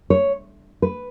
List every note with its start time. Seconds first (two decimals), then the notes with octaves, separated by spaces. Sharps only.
0.10 C#5
0.82 B4